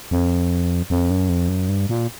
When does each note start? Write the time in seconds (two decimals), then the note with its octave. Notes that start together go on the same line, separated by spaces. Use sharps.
0.11 F2
0.90 F2
1.11 F#2
1.29 F2
1.49 F#2
1.68 G2
1.89 A#2